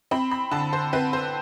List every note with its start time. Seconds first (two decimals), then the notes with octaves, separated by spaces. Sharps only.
0.11 C4 B5
0.31 B5
0.51 D3 A5
0.73 C5
0.93 C4 B4
1.13 C5